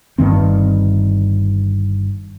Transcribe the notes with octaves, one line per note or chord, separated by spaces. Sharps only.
G1 G2 D#3 C4